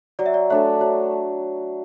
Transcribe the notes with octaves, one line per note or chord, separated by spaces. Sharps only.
F#3 D5
E5
D5
A3 D4 A4 C#5
F#3 C#5